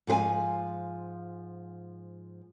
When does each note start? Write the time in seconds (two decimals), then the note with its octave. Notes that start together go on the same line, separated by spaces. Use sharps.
0.07 G#2 F3 G#4 F5 G#5